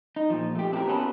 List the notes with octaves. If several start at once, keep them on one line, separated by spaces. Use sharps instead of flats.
D#4
A#2 F3
A3 G4
C4 D4 E4 F4 G4 A#4
B3 C#4 F#4 A4 B4